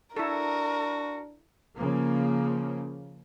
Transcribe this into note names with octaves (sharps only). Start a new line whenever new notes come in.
D4 E4 F#4 A4 A#4
C#3 F3 A#3